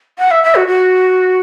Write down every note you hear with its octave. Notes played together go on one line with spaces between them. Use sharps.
F#5
E5
E5
F#4
F#4